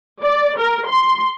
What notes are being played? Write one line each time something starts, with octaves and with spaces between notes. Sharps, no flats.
D5
A#4
C6